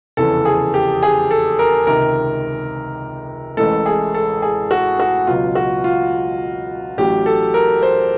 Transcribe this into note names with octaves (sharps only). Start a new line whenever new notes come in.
F1 E2 C#3 E3 A4
G#4
G4
G#4
A4
A#4
C#2 C3 D#3 A#4
A1 A2 E3 G#3 A4
G#4
A4
G#4
F#4
F#4
C#2 B2 F#3 F4
F#4
F4
A1 A2 F#3 G4
A4
A#4
C5